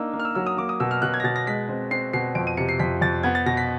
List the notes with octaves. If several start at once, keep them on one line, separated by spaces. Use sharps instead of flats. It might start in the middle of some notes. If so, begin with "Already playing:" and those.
Already playing: A#3 D4 D#4 E6
A#3
F6
E6
F#3 E6
D#6
A#3 D6
D#6
B2 E6
F6
B2 F#6
G#6
A#6
B2 A6
A#6
G#3 B6
C4
C4 C7
B2 C7
F2 D7
D#7
C3 C#7
C7
F2 B6
F2 A6
B3 G#6
A6
B2 A#6
B6